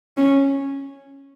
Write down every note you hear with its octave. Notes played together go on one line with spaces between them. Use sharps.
C#4